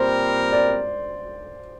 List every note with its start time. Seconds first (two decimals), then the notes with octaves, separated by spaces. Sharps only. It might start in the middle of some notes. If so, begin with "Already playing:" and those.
Already playing: A#2 G3 C4 A#4 C5
0.52 D5